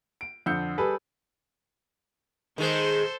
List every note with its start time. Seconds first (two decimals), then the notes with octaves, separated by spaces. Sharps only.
0.21 D7
0.46 F2 D3 E6 G6 C#7
0.78 G3 G#4 A4 B4
2.58 D#3 G#3 A4 C5